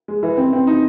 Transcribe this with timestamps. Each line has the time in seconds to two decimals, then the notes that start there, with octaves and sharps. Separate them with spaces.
0.08 G#3
0.23 E3
0.37 C4
0.53 C4
0.67 D#4